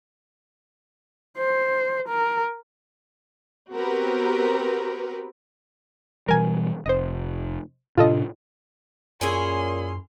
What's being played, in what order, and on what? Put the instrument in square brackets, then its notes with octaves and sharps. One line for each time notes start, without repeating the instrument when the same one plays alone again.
[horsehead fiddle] C5
A#4
[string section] B3 C4 F#4 G4 A#4 B4
[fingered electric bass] B2 E3 G3 [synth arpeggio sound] A#4 G#5
[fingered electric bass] F1 [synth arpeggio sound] C5 D#5
[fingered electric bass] A2 C3 D4 [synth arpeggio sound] F4 A4 D#5
[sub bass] F#2 [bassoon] A#2 [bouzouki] C#4 E4 G#4 [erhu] C6